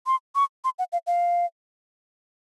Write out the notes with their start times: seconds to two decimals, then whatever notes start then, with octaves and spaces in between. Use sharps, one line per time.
0.07 C6
0.35 C#6
0.64 C6
0.79 F#5
0.93 F5
1.07 F5